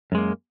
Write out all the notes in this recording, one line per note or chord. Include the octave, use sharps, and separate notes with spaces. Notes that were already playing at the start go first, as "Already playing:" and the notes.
F#2 G#3 A#3